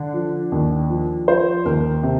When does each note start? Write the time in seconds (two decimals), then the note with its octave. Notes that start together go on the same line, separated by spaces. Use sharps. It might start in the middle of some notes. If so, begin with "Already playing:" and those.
Already playing: D3 D4
0.14 F3
0.52 D#2
0.89 F3
1.28 F3 C5
1.65 D#2 A#4
2.03 C3